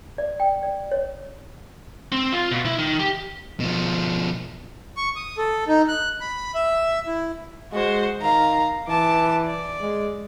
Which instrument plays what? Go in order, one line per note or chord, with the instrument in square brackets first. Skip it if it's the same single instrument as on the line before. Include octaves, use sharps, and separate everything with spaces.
[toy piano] D5
G5
D5
C#5
[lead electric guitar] C4
F4
B2
E4
D#3
G4
B2 F3
[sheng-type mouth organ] C#6
D#6
A4
D#4
F#6
B5
E5
E4
[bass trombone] G#3 [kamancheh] F#4 C5
[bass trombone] D#3 [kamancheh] F5 A#5
[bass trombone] E3 [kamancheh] A5 D6
[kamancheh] D5
[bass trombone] G#3